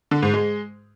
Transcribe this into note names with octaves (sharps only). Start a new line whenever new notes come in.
D3
G#2
G#3